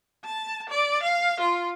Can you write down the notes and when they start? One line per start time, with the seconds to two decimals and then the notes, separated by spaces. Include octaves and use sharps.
0.25 A5
0.69 D5
1.03 F5
1.40 F4